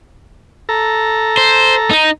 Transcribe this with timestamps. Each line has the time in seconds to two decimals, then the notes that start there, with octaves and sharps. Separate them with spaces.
0.69 A4 A#5
1.37 C5
1.91 D#4